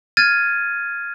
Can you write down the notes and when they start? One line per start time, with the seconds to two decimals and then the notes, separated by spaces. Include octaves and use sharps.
0.17 F6 G#6 A6 D#7